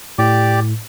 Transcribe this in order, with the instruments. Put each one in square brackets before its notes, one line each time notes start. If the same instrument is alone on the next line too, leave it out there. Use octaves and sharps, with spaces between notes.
[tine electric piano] A2 [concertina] G4 D5 D6